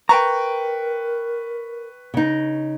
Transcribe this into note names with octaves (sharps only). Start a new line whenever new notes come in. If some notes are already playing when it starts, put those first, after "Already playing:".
A#4 B4 G5 A5 A#5 C#6
C#3 D#4